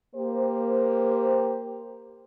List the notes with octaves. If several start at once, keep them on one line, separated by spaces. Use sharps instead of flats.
A#3 G4 C5